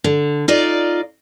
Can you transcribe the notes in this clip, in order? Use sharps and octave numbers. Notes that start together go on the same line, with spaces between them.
D3
D#4 F4 D5